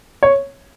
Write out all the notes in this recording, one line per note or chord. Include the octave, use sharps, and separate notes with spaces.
C#5